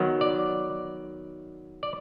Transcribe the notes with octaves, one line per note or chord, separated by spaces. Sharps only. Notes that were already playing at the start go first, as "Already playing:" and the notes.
Already playing: D#3 F#3 B3
D5
D5